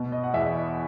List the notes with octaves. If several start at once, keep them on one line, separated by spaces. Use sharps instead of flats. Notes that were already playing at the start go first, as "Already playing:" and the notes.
Already playing: B2
D#5
F#5
E2 E5